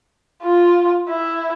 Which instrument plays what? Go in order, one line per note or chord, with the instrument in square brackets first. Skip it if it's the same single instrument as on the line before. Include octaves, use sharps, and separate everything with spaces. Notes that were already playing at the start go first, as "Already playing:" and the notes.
[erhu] F4
E4